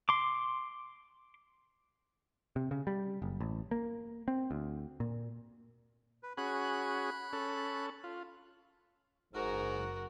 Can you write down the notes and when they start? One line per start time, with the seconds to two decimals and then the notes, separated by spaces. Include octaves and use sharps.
0.09 C6 D6
2.56 C3
2.71 C#3
2.87 G3
3.22 F#1
3.40 A1
3.71 A#3
4.28 C4
4.51 D2
5.00 A#2
6.23 B4
6.37 C#4 F#4 G#4 B5 F#6
7.33 C#4 A4
8.04 F4
9.35 F#1 G#2 F#4 A#4